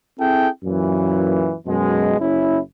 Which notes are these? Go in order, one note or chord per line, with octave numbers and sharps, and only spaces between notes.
C4 E4 G#4 A4 G5
F#2 A#2 E3
F#2 B2 G#3
F#1 C#4 E4